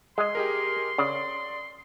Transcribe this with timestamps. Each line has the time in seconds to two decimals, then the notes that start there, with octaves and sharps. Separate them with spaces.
0.18 G#3 D#5 C6
0.35 G4 G#4 A#4
0.98 C#3 D5